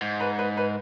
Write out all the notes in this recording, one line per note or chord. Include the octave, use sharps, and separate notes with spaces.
G#2
B4
B4
B4